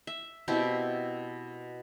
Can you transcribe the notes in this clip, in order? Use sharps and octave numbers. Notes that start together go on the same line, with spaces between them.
E5
B2 C4 E4 G4